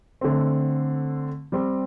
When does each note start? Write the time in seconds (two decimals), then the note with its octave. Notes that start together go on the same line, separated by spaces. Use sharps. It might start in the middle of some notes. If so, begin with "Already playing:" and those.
0.21 D3 A3 C4
1.52 G3 C4 G4